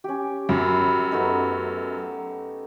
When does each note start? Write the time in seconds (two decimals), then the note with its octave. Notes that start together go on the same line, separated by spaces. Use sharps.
0.04 C#4 G4
0.49 F#2 B5
1.12 A3 B3 D#4